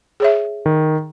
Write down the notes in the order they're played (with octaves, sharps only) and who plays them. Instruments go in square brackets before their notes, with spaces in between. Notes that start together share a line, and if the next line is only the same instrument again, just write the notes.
[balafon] G#4 C#5 E5
[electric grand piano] D#3